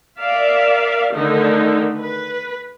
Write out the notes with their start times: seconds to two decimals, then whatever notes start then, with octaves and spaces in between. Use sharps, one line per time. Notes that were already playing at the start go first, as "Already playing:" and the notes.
0.20 A#4 D5 E5 F5
1.13 D3 D#3 A3 D#4
1.99 B4